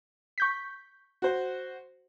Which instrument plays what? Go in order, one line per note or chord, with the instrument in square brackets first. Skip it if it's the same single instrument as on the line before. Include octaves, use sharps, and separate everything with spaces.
[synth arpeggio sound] C#6 G6 B6
[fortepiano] F#4 C5